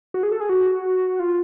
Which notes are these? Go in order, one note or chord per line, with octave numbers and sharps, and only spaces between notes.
F#4
G#4
A4
G#4
F#4
F4